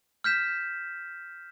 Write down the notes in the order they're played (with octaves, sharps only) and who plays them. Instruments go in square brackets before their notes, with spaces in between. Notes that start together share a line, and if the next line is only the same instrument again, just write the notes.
[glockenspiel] F6 G6 B6 E7